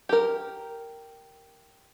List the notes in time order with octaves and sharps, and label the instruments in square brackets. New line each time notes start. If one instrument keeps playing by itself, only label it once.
[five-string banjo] G4 A#4